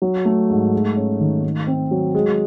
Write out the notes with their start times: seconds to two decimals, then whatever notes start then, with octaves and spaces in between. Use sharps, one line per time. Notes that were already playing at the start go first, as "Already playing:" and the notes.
0.02 F#3
0.25 A3
0.50 G#2
0.73 G#3
0.96 C#4
1.19 D#3
1.43 A3
1.67 C4
1.91 F#3
2.15 G#3